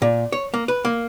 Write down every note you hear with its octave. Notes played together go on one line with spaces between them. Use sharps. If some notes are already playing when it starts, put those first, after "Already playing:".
A#2
C#5
A#3
B4
A#3